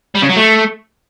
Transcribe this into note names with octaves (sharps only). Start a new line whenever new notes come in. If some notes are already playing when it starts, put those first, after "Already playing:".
G3
C#3
F#3
A3